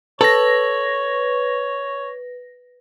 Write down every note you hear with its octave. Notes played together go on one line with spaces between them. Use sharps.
A4 B4 C#5 A#6